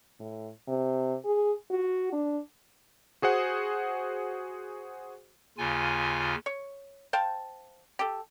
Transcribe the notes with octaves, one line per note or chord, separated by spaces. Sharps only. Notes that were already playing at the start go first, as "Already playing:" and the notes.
A2
C3
G#4
F#4
D4
F#4 G#4 C5 F#5
D#2 C#3 F4 G#5
C#5
C5 F5 G5 A5
G4 A4